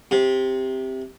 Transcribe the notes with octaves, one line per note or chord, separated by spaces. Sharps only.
C3